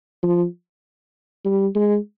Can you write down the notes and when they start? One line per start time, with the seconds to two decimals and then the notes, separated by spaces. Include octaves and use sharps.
0.23 F3
1.45 G3
1.75 G#3